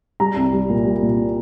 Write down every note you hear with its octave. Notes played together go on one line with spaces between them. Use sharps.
G3 A#5
C2
G3
A#2
G3
A#2